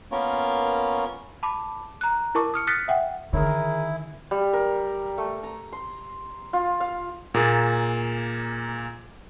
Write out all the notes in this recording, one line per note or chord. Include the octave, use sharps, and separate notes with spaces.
A#3 B3 C#4 F4 A#4 C#5
A5 B5 D6
A#5 F#6
E4 A#4 A5 C#6 D6
D#6 F6 C#7
D#6 F6 F#6 A6 B6 C#7
E5 F#5 G5
D3 D#3 E4 G#4 A#4
G3
A#4
A3
A#5
C6
F4
F5
A#2 A#3 G#4 A6